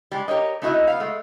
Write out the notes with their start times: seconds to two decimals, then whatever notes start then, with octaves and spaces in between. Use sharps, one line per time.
0.12 G3 G#3
0.28 G4 A#4 C#5 D#5
0.62 A3 D#4 E4 F#4 D#5 E5
0.87 B3 F5
1.00 G#3 A3